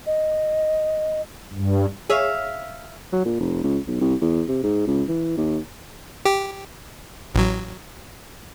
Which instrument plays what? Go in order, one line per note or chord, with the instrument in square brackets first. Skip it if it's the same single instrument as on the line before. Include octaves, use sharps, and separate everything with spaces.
[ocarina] D#5
[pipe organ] G2
[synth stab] G#4 C#5 [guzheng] E5 F5
[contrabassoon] F#3
A#2
F1
C#2
B1
C2
E2
C3
G#2
C#2
E3
D#2
[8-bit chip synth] G4
A1 F#3